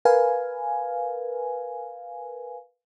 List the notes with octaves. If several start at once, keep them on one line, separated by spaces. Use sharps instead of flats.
A#4 B4 F5 G#5